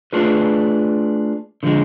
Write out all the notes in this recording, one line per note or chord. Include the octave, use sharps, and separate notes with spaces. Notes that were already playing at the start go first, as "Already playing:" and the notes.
A3 D4 F4 G#4 B4
D3 F3 G#3